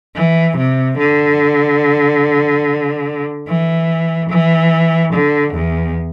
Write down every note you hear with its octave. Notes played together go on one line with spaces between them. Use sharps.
E3
C3
D3
E3
E3
D3
E2